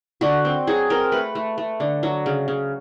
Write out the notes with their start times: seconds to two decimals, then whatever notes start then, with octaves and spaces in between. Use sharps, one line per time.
0.21 D3 F#4
0.45 C4
0.67 F#3 G#4
0.90 C4 A#4
1.12 A3 B4
1.35 A3
1.58 A3
1.80 D3
2.03 F#3
2.26 C#3
2.48 C#3